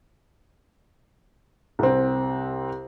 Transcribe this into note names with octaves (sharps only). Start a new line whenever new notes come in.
C2 C4